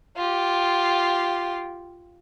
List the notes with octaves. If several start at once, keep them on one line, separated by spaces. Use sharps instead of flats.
F4 G4